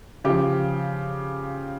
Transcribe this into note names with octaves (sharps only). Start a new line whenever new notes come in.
C#3 F3 G4